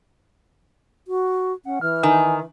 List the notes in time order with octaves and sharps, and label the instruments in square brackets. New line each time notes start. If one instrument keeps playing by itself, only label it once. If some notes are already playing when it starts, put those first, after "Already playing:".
[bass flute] F#4
[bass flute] C#4 [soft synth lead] F#5
[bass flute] E3 [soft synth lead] F6
[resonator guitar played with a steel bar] D#3 [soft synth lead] G#5